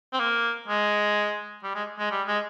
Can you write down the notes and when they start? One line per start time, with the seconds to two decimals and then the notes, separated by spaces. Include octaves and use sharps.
0.13 C4
0.19 A#3
0.68 G#3
1.63 G3
1.75 G#3
1.98 G#3
2.11 G3
2.27 G#3